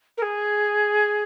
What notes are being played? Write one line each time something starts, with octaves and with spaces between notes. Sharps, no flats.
A#4
G#4